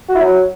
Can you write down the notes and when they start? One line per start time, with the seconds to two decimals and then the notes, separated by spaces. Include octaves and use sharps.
0.09 F#4
0.15 E4
0.21 F#3